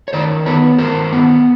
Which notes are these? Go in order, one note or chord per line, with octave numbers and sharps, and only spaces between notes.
C#5
D#3 C5 D5
B3 B4 C#5
D#3 A#4 C5
B3